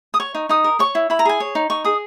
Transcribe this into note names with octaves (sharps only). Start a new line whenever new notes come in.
D#6
C#5 C#6
D#4
D#4 D#6
A#4
C#5 C#6
E4
E4 B5
A#5
G#4 G#5
C#5
D#4
D#4 C#6
G#4 D#6